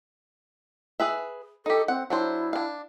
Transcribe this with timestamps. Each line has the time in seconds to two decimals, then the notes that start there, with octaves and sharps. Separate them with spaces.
1.00 G#4 B4 E5
1.66 D#4 G4 A4
1.88 C4 F#5
2.10 F#3 D4 E4 C5
2.53 D4 F5